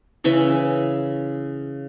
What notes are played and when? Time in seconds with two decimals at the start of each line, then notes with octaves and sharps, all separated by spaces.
0.24 C#3 E3 C#4 E5